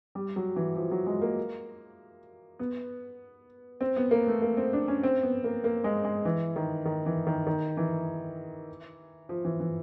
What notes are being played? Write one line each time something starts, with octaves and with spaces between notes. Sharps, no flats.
G3
F#3
E3
F3
F#3
G#3
A#3
B3
C4
B3
A#3
A3
A#3
C4
D4
C#4
C4
B3
A#3
A#3
G#3
G#3
E3
D#3
D#3
E3
D#3
D#3
E3
F3
E3
E3